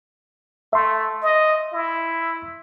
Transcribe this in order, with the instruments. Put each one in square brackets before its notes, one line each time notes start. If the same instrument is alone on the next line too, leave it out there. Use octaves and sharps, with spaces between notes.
[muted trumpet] A3 [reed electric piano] E5 C6
[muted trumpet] D#5
E4